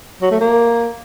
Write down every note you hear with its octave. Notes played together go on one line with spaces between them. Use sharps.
F#3
A3
A#3